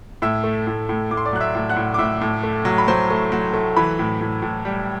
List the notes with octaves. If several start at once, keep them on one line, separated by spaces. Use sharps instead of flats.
A2 E5 E6
A3
A2
A2
A2 D6
C6
D5 D6
F#3 F#6
E5 E6
A2
F#5 F#6
A2
D6
A2 E5 E6
A2
A3
F#3
B5
F#3 C5 C6
A3
F#3
A3
E3 B4 B5
A2
A2
A2
G3